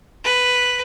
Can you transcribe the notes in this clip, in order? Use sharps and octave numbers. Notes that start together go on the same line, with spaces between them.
B4